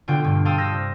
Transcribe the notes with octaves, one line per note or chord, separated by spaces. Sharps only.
B2 D3 F4 G5
G2
F5 G5 A5 C6 D#6 E6
D#6 E6 G6 A#6
C3